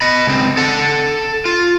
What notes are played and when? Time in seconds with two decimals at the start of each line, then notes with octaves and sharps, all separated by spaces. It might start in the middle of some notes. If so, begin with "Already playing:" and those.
0.01 D#5 B5
0.27 C#2 C4
0.57 A4 F#5
1.45 F4